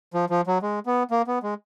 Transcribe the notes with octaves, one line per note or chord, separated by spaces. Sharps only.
F3
F3
F#3
G#3
B3
A#3
B3
G#3